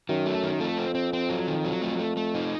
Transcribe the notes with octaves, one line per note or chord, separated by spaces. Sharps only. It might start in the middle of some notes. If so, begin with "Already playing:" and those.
F#2 D#3
A3
D#3
F2 A3
C4
C4
C4
F#3
D#3
F#3
A3
A3
A3
D#4